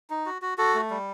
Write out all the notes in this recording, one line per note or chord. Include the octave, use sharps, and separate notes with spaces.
D#4
F#4
F#4
F#4 A4
A3
G3